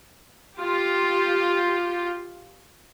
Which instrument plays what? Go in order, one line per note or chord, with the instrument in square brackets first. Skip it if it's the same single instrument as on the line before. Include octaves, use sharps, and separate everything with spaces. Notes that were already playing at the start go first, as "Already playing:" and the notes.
[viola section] F4 G4